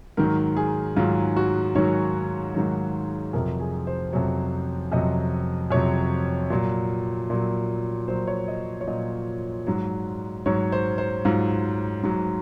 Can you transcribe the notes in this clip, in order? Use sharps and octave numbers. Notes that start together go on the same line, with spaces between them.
G#2 D#3 F#3 A#4
G#4
G#2 D#3 F#3 F4
F#4
G#2 D#3 F#3 C#5
G#2 D#3 F#3
F2 C3 F#3 A#4
G#4
C5
F2 C3 F#3 C#5
F2 C3 F#3 D#5
F2 C3 F#3 C#5
A#2 F#3
A#2 F#3
A#2 F#3 C5
C#5
D#5
C#5
A#2 F#3 D#5
G#2 F#3
G#2 F#3 C#5
C5
C5
G#2 F#3 F4
G#2 F#3